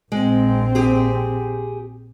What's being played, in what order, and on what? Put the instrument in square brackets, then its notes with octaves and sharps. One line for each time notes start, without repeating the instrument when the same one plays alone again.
[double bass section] A#1 C4 [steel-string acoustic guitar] G#3
[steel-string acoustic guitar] G4 G#4